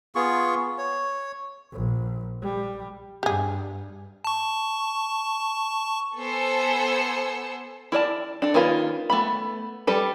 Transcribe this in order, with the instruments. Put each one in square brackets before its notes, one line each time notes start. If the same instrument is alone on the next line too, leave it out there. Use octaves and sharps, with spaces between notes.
[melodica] B3 F4 G#4 C#6
C#5
[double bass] A#1
G3
[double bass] G2 [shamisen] G4 G#4
[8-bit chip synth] A5 C#6
[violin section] B3 A4 C5 G#5 E6 C#7
[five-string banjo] E4 A#4 D5 A5
D4 A4
D#3 A#3 C#4 F4 B4
A3 B3 B5
G3 A4 B4